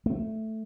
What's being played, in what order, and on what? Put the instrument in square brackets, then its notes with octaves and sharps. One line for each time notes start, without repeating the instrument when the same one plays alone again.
[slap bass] A3